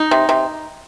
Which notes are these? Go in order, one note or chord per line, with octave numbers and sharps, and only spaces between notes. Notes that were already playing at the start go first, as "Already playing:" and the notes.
Already playing: D#4
C3
C3